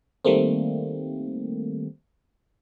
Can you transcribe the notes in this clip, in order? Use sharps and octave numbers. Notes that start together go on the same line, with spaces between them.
D#3 G3 A3 A#3 C4